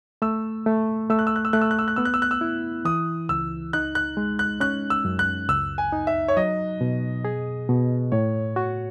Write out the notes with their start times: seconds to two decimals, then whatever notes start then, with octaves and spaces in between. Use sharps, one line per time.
0.22 A3 E6
0.66 A3
1.10 A3 E6
1.19 F#6
1.27 E6
1.36 F#6
1.45 E6
1.53 A3 F#6
1.61 E6
1.71 F#6
1.79 E6
1.88 F#6
1.96 B3 E6
2.05 F#6
2.14 E6
2.22 F#6
2.31 E6
2.41 E4
2.85 E3 D#6
3.29 C#2 E6
3.73 D#4 F#6
3.95 F#6
4.17 G#3
4.39 F#6
4.60 C#4 F#6
4.90 E6
5.05 F#2
5.19 F#6
5.49 C#2 E6
5.78 G#5
5.92 D#4
6.07 E5
6.28 C#5
6.37 F#3 D#5
6.81 B2
7.25 G#4
7.69 B2
8.12 A2 C#5
8.56 F#4